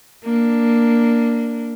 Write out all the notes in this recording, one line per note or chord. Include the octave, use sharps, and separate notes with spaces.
A#3 D4